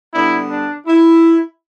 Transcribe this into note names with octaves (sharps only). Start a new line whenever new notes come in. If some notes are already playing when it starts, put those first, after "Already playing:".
D3 G3 B3 D4 E4
D4
E4